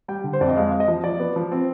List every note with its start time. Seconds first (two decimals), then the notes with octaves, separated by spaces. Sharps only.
0.08 G3 G5
0.24 D3
0.33 C5
0.41 F2 D5
0.49 D#5
0.56 G#3 F5
0.72 G#3
0.80 D#5
0.88 F3
1.04 F3 D5
1.20 B3
1.36 F3
1.52 C4